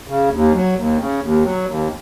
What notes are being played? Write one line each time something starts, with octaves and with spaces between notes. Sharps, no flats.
C#3
D#2
F#3
D#2
C#3
D#2
F#3
D#2